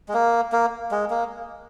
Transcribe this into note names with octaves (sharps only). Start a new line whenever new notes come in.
G#3
A#3
A#3
G#3
A#3